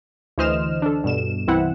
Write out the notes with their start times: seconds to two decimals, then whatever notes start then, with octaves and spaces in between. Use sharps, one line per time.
0.38 D2 E3 C5 D#5 F6 E7
0.82 D4 A4
1.04 G2 B2 E7
1.48 C2 E3 C4 E4 F#5